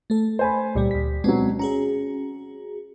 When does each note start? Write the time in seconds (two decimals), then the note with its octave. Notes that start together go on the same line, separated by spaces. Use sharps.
0.10 A3 A4
0.39 C5 G#5 B5
0.75 C#2 A#2 G3 G4 D5
0.91 D2 B6
1.24 B2 F#3 G#3 C4
1.59 C#4 F#4 G#4 A#5